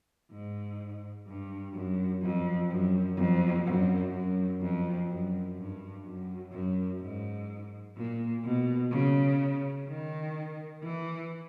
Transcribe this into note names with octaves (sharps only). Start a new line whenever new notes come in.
G#2
G2
F#2
F2
F#2
F2
F#2
F#2
F2
F#2
G2
F#2
F#2
G#2
A#2
B2
C#3
D#3
E3